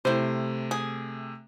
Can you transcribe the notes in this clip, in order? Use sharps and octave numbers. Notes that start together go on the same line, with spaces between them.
C3 A3 E4 C5
G#4